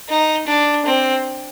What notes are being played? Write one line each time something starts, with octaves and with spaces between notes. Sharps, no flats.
D#4
D4
C4